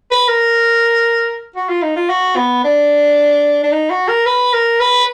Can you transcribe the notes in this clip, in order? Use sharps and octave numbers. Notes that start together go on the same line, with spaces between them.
B4
A#4
F#4
F4
D#4
F4
F#4
B3
D4
D4
D#4
F#4
A#4
B4
A#4
B4